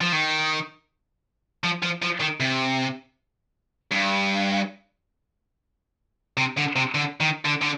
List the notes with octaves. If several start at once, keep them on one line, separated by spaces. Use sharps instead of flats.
F3
D#3
F3
F3
F3
D#3
C3
G2
C3
D3
C3
D3
D#3
D3
D3